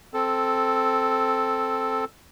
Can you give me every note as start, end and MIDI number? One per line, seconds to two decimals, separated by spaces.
0.14 2.05 60
0.14 2.05 69